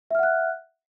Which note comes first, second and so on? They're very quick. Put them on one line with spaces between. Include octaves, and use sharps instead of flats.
E5 F6 F#5 F#6